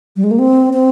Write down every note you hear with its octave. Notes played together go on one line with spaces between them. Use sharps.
G3
G#3
A#3
C4
C4